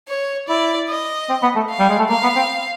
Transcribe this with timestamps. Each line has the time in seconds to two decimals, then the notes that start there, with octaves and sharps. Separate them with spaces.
0.09 C#5
0.48 E4 D5
0.89 D#5
1.29 C4
1.42 B3
1.56 A3
1.70 F5
1.79 G3
1.90 G#3
1.99 A3
2.09 A#3 F5
2.23 B3
2.36 C4